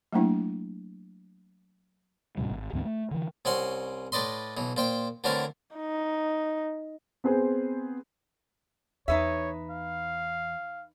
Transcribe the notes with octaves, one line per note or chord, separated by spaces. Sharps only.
F#3 A3 A#3 D4 E4
D#2 A2 C3 G3
G#1
D2 G#2 E3 C4
A3
D3 E3
C2 C4 C#4 F#5 C6
A2 B4 D5 D#5 C6
B1 E3
A#2 C5 G5
D3 E3 F#3 A3 C4 A#4
D#4
B3 C4 G#4 C5
E2 D#4 B4 C#5 E5
F5